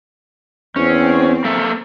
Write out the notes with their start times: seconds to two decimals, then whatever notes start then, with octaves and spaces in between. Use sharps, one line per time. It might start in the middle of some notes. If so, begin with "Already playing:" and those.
0.76 E2 C4 C#4
1.44 A#3 A4 E5